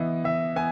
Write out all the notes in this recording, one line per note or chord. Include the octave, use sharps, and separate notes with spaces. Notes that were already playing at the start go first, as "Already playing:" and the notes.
Already playing: E3 B3 D#5
E3 E5
B3 G#5